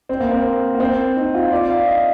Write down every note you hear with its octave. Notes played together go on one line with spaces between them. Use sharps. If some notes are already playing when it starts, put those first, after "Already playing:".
C4
A#3
C4
A#3
C4
D#4
F4
D5
F5
D#5